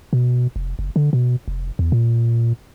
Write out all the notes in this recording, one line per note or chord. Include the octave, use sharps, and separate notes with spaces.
B2
F1
F#1
D3
B2
F1
E2
A#2